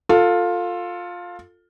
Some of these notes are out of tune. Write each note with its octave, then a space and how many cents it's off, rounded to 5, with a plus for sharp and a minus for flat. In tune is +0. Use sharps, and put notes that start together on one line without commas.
F4 +15 A4 +20